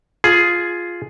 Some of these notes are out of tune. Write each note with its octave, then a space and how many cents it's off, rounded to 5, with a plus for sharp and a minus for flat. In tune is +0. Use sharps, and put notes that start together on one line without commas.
F4 +0 G#4 +10